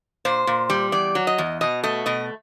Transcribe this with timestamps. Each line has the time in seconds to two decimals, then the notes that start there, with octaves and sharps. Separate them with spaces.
0.25 A#2 C5
0.47 A#2
0.70 G3
0.92 E2 D5
1.15 F#3
1.27 D#5
1.38 E2
1.61 B2 D#5
1.83 A3 D#5
2.06 B2 D#5